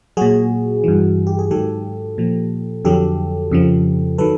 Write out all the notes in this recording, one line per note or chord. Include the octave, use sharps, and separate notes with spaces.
A#2 F#3 F#4 G#4
G2 E3
G4
G#4
G#2 D#3 F#3 G4 A4
A#2 F3
F2 D3 F#3 G4 A4
F2 C#3 F3
D#3 F#3 A4 B4